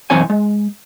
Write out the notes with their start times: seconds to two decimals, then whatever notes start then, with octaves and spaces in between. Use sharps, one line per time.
0.10 B1 F#2 E3 C4 C#5 G#5
0.30 G#3